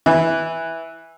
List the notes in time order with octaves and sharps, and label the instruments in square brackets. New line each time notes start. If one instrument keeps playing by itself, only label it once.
[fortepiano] E3